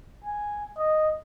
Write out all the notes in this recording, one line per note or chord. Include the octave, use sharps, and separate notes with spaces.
G#5
D#5